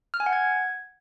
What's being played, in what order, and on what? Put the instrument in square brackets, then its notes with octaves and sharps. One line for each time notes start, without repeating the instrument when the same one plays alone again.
[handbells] F6
G#5
F#5
G#6